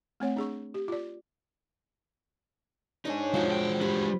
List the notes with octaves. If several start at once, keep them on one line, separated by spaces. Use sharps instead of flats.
A3 C4 C#5 F#5
D4 G#4 C#6
G4
F4 D5
D4 D#4 G#4 C#5
F3 G#3 F#4 C5
G5
D4 G4 B5